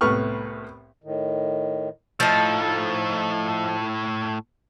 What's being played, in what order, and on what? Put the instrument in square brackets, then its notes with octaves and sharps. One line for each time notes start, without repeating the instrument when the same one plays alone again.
[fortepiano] C2 A2 B3 C#6 F6
[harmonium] A2 D#3
[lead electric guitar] A2 A3 [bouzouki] F3 D#4